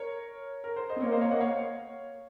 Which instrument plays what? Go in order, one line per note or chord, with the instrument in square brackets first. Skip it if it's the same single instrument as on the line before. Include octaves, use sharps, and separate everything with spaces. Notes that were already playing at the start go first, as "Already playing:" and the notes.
Already playing: [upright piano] A#4 C#5
A#4
C5
C5 D#5
[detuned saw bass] C4
[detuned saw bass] A#3 [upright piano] A#4 C#5
[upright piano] C5 D#5
C#5 F5
D#5 F#5
C#5 F5